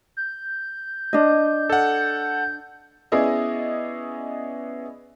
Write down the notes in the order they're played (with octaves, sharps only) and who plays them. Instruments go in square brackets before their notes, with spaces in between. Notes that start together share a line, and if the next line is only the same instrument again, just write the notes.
[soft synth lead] G6
[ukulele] D4 D#5
[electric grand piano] A4 F#5
[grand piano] B3 C#4 E4 G#4 D5 D#5